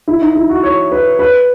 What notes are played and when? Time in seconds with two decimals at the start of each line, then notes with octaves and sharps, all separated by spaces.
0.08 E4
0.21 D#4
0.35 E4
0.49 F#4
0.63 C#5
0.92 B4
1.19 B4